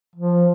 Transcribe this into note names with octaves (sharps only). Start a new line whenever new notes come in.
F3